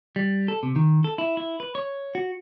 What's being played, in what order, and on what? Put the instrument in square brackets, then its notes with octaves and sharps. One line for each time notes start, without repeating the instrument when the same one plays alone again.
[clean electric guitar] G3
A4
C3
D#3
A4
E4
E4
B4
C#5
F#4